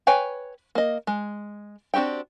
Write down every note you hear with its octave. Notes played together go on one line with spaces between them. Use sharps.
B4 C#5 G5 G#5
A#3 D#5
G#3
C4 D4 F#4 G4 G5